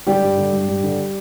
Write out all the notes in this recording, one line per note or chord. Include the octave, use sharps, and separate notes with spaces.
D3 G3 G4
G2
D3
G2
G2
D3